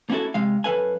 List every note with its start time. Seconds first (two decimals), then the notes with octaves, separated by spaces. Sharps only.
0.10 A#3 B3 C#4 E4 F#4 A4
0.34 C3 G#3 F5
0.64 F#2 G3 A4 B4 F5 G#5